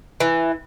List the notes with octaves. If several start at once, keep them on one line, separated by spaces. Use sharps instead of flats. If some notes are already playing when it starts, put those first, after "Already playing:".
E3